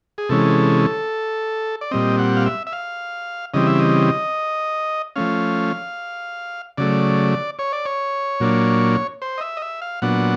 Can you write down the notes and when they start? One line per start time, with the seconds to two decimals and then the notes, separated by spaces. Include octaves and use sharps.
0.18 G#4
0.29 C3 E3 G#3 C#4 A4
1.81 D5
1.91 A#2 G3 C4 D#5
2.19 F#5
2.37 F5
2.46 E5
2.67 E5
2.73 F5
3.54 C#3 E3 G3 C4 D#5
3.67 E5
3.80 D#5
5.16 F3 A3 C#4 F5
6.78 C#3 F#3 A3 D5
7.59 C#5
7.73 D5
7.85 C#5
8.40 A#2 F#3 A#3 D4
9.22 C5
9.38 D#5
9.41 E5
9.57 D#5
9.62 E5
9.82 F5
10.02 A#2 F#3 B3 D4 F#5